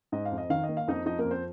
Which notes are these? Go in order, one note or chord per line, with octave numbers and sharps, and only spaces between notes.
G#2 D#5
F5
F2
D#5
D#3 F5
D#5
A#3
F5
F2 D#4 D#5
F3 D#4 D#5
A#3 A#4
F2
C4 C5